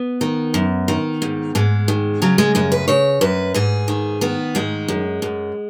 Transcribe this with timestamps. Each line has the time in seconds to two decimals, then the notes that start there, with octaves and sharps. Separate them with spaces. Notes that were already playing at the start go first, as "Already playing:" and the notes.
Already playing: B3
0.21 D#3
0.54 F#2
0.88 D#3
1.22 G#2
1.55 G#2 G#3
1.88 D#3
2.22 C#3 F#3
2.38 G#3
2.55 F#2 G#3
2.72 B4
2.88 C#3 C#5
3.21 F#2 B4
3.54 G#2 G#4
3.88 D#3
4.21 D#3 B3
4.55 G#2 G#3
4.88 F#2
5.22 F#2